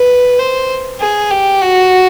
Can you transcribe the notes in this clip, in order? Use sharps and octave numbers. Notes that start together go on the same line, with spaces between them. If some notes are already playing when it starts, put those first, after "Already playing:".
Already playing: B4
C5
G#4
G4
F#4